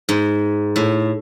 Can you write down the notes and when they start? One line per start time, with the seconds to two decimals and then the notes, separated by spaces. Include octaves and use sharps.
0.09 G#2
0.76 A2